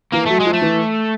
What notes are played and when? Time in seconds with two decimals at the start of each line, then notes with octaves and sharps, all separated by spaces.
0.13 E3 A#3
0.26 F#3 A3
0.40 G#3
0.46 F3
0.53 A3
0.62 E3